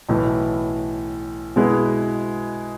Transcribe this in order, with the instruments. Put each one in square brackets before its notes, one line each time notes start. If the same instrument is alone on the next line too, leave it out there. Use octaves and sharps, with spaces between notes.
[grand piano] B1 A2 E3
B2 G#3 B3 E4 G#4